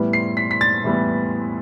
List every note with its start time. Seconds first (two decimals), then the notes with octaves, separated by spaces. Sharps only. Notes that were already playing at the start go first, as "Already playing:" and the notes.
Already playing: A2 E3 G3 B3
0.13 C7
0.37 B6
0.51 B6
0.61 A6
0.84 A2 E3 G3 B3